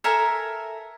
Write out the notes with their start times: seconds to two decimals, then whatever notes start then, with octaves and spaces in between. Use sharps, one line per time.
0.04 A4 A#4 E5 G#5